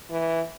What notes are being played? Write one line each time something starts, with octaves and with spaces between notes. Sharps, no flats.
E3